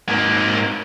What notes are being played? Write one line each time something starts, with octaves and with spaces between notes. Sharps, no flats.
G#2 A#3